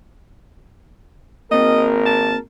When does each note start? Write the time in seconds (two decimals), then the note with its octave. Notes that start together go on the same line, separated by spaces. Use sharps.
1.51 G#1 A#3 C4 A#4 D#5
2.06 A5